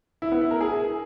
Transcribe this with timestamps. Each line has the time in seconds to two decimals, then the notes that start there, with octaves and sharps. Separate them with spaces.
0.22 E4
0.32 B3
0.41 E4
0.51 A#4
0.61 G#4